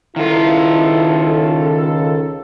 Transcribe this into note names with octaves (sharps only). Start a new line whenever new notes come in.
C#2 D#3 E4 F4 A4